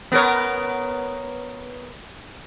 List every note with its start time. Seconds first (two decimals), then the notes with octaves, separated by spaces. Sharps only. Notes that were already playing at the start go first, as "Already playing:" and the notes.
0.12 B3 A#4 C#5